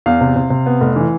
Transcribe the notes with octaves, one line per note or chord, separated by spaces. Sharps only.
E2 F5
C3
C3
C3
B3
F1
E3